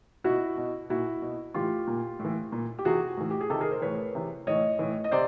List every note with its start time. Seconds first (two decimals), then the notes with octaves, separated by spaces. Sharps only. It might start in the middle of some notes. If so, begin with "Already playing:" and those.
0.24 B2 E4 F#4
0.57 B2
0.90 A#2 E4 F#4
1.22 B2
1.54 A2 E3 F4 G4
1.87 A#2
2.19 A2
2.24 E3
2.52 A#2
2.79 G4
2.85 C3 E3 F#4 G#4
3.17 A2 E3
3.30 G4
3.41 G#4
3.50 C3 D#3 G4 A4
3.61 G#4 A#4
3.71 A#4 C5
3.82 A2 E3 B4 C#5
4.15 C3 E3
4.47 A2 E3 C#5 D#5
4.79 A2 E3
5.04 D#5
5.11 C3 C5 D5